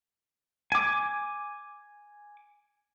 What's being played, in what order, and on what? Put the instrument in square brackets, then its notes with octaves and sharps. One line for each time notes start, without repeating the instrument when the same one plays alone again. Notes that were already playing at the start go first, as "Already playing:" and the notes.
[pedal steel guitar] G#5 D6